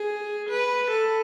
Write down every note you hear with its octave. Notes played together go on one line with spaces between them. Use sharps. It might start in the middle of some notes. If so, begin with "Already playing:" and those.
Already playing: G#4
B4
A4